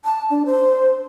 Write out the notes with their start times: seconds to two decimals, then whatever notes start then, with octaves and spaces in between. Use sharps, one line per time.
0.05 A5
0.30 D4
0.46 C5